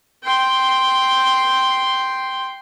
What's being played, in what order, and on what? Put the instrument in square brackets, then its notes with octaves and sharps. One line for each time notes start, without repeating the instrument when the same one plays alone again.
[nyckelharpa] G5 C6